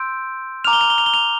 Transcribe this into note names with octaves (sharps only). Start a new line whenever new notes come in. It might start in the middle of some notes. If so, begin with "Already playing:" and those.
Already playing: C6 E6 G6 D7
A#5 D6 F6 F7
G7
F7
G7
F7
G7
F7